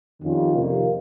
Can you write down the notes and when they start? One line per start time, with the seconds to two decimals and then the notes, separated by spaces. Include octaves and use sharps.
0.23 F2 D#3 G3 C#4 F4
0.54 F2 C3 D#3 A#3